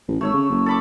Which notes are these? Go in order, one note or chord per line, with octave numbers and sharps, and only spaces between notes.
A1
G#1 A3 C#5 E6
C#3
F#1
A4 B5 D6